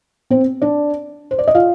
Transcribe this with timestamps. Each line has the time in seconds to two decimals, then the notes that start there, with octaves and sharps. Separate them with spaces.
0.30 C4 C5
0.62 D4 D5
1.31 C5
1.39 D5
1.48 D#5
1.55 F4 F5